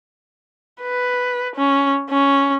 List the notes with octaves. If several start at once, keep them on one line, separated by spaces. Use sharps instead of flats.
B4
C#4
C#4